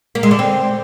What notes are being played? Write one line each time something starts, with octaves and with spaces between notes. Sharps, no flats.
A#3
G#3
D3
C4